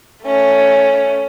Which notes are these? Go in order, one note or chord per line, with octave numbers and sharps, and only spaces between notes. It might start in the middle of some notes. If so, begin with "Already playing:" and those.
A3 C#4